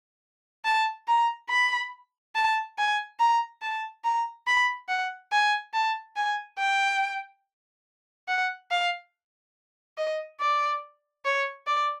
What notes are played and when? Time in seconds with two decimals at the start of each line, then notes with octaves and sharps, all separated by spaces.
0.65 A5
1.08 A#5
1.50 B5
2.35 A5
2.78 G#5
3.20 A#5
3.62 A5
4.04 A#5
4.47 B5
4.89 F#5
5.32 G#5
5.73 A5
6.16 G#5
6.58 G5
8.28 F#5
8.71 F5
9.98 D#5
10.40 D5
11.25 C#5
11.67 D5